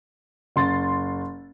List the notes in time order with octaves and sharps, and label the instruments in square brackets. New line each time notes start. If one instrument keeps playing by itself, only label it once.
[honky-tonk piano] F#1 C6 A6